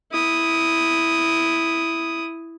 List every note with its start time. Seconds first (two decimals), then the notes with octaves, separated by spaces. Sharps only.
0.11 E4 D#6